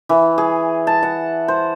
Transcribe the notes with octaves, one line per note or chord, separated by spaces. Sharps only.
E3
G#4
A5
F#5
C5